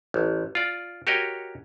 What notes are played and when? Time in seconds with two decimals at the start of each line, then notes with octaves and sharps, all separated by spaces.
0.14 A1
0.55 F4 D5
1.07 F#4 G4 A#4 C#5 D#5